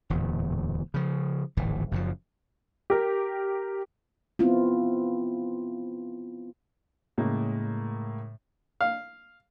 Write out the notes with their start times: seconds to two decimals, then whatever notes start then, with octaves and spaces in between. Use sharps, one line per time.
0.10 D1 E2 A#2
0.94 C#3 F3
1.57 D1 G#1 E3
1.91 F#1 F#2 C#3 F3
2.90 G4 A#4
4.39 B3 C4 E4 F4
7.18 A2 C#3 G#3 A#3
8.81 F5